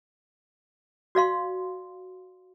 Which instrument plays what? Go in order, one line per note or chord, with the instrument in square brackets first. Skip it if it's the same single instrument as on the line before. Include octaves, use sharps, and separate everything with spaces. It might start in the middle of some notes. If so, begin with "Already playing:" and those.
[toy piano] F#4 D5 F5 C6